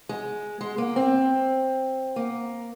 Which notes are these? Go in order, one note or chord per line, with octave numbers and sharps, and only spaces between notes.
G#3
G#3
A#3
C4
A#3